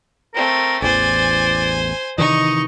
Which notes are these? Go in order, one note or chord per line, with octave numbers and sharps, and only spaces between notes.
A3 C4 A#4
A1 E2 C5 D5 G#5
C3 D#3 E3 D#4 D#5 C#6